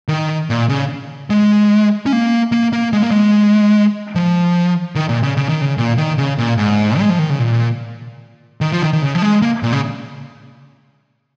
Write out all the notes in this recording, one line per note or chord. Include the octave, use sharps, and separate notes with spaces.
D#3
A#2
C#3
G#3
C#4
A#3
A#3
A#3
G#3
A#3
G#3
F3
D#3
A#2
C#3
C#3
D#3
C#3
A#2
D#3
C#3
A#2
G#2
G#3
F3
D#3
C#3
A#2
D#3
F3
D#3
D#3
C#3
F3
G#3
A#3
A#2
C#3